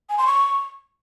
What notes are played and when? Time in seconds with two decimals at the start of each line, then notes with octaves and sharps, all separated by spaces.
0.09 G#5
0.18 C6
0.27 C#6